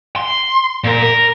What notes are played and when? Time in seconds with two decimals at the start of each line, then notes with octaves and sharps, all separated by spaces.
0.16 C6
0.84 A#2 A#4
1.03 A#4